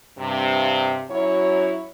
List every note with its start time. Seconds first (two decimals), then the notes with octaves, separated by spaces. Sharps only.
0.17 G2 C3
1.09 F#2 F#3 E4 C#5